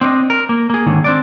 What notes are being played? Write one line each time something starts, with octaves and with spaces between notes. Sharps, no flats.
C4 D4 C5 D#5
A#4
A#3
A#3 G#4
D#2 G#2 D3 D#3
C4 D4 D5